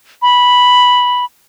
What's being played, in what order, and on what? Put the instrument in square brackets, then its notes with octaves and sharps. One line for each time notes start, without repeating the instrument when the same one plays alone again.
[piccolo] B5